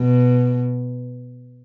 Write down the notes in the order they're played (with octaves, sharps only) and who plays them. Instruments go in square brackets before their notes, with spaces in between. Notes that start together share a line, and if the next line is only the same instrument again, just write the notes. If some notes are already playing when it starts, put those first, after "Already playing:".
Already playing: [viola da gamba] B2